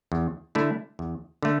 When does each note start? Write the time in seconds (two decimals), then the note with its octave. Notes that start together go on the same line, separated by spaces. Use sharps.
0.12 E2
0.55 D3 A3 E4
0.99 E2
1.42 D3 A3